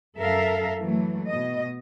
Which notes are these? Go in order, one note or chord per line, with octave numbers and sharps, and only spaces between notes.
F#2 A4 A#4 E5 F5
E3 F#3 A3
B2 D#5